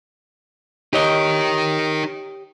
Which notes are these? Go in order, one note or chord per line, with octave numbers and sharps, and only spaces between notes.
D#4 G4 A#4 C#5 D#5